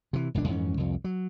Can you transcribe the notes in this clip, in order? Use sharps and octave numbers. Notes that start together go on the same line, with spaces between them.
C3 E3
E1 C#2 A2 D4
F2 G#2 E3 C#4
C2 F2
F#3